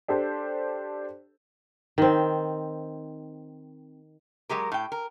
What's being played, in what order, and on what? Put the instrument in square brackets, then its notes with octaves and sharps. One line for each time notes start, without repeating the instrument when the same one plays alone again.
[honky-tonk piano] D4 G4 A4 C5
[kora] D#3 C4
[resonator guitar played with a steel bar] F#3 G#3 G4 A#4
A2 G5
A#4